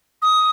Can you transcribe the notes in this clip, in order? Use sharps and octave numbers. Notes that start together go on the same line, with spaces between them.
D#6